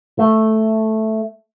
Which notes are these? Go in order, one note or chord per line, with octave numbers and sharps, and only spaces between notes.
A3